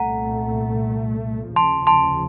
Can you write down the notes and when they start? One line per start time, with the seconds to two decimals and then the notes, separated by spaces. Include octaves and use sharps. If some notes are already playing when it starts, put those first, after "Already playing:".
Already playing: C2 A#2 A3 F#5 A#5
1.56 F1 D#2 C#3 F3 A5 C6
1.87 A5 C6